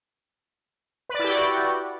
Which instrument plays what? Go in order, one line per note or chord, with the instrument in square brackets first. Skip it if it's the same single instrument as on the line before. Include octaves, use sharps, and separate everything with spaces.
[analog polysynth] B4
D5
E4
G4
F#4